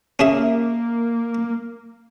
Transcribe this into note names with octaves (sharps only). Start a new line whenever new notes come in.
A#3 C#4 G#4 E5